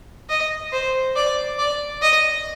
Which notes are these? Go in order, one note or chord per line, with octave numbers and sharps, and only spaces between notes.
D#5
C5
D5
D5
D#5